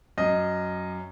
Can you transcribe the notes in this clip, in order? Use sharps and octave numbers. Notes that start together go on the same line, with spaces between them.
F#2 F#3 D#5